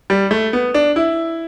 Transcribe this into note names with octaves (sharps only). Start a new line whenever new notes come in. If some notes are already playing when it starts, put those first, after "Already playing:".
G3
A3
B3
D4
E4